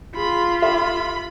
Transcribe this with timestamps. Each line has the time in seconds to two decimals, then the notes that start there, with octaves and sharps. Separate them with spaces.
0.16 F4 G#4 B5
0.62 G4 A4 E5 B5